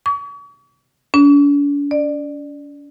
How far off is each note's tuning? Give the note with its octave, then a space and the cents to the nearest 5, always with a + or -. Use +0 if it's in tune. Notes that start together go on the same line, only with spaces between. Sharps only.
C#6 +45
D4 -45
D5 +20